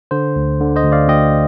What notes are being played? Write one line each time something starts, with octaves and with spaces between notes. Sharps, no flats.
D3 C5
D2
D3
C5 D#5
D2
D5 F5
D2 D#5 G5